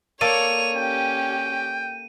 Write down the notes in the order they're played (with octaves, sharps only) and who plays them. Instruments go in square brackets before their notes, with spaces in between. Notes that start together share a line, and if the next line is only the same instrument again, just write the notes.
[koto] A#3 A4 D5 [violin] C#5 F7 [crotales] D#7
[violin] C#4 G4 [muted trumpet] G5